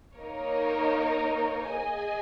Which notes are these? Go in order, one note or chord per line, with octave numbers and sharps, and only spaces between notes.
A#3 D#4 A#4 C#5
G#4 D#5 G#5